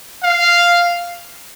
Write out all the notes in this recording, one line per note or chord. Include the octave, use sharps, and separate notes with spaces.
F5